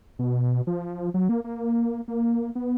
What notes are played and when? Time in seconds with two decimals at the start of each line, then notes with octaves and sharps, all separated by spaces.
0.19 B2
0.67 F3
1.14 F#3
1.29 A#3
1.44 A#3
2.08 A#3
2.55 B3